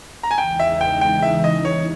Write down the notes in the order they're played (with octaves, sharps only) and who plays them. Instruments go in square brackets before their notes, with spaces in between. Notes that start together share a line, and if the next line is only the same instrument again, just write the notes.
[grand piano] A#5
G#5
[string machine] E2 C#3 E3 G#3 D#4 [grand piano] G5
[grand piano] E5
G5
G5
E5
D#5
[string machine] E3 G3 [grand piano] C#5